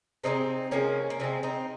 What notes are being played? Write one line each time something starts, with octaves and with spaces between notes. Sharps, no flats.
C3 F3 G#3 C4 D#4
C3 F3 G#3 A#3 C#4
A#3
C3 F3 G#3 C4
C4 D#4